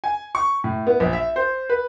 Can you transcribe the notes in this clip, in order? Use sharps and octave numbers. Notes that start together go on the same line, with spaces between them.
G#5
C#6
A2
B3
A#1
E5
C5
B4